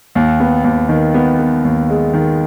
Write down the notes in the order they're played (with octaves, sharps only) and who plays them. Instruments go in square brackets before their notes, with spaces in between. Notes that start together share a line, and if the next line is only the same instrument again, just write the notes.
[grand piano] D#2
B3
D#2
D#3
B3
B3
D#2
G#3
D#3